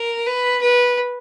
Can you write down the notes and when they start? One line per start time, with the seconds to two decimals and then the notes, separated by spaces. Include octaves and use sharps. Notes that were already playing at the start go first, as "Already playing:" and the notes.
Already playing: A#4
0.26 B4
0.61 B4